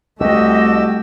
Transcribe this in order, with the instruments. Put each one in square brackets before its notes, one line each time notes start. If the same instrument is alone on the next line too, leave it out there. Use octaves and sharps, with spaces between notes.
[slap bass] C2 [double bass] A3 [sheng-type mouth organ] F#4 G4 E6 [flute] D#5